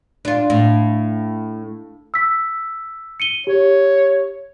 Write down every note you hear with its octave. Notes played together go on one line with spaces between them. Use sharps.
D4 F4
A2
E6 B6
C#7 D#7 G7
G4 C#5